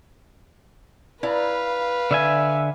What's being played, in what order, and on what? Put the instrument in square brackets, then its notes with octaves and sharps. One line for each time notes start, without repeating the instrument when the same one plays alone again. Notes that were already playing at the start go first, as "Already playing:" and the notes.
[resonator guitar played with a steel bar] E4 D5 A#5 [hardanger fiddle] B4 F5
[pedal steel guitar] D3 E5 G#5 [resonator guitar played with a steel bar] D5